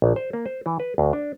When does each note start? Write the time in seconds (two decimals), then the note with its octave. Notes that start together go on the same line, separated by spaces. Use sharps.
0.02 A#1
0.16 C5
0.33 A#3
0.46 C5
0.66 E3
0.80 B4
0.98 D2
1.13 D4